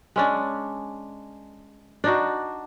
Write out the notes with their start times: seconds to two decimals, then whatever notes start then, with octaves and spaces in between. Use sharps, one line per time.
0.16 G#3 C#4 D4
2.04 D4 D#4 F#4